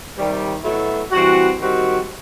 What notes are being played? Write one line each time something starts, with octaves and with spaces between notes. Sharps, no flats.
C3 D#3 G3
B2 F#3 A3 E4
E3 G3 C4 F#4
D#3 G3 C4 F#4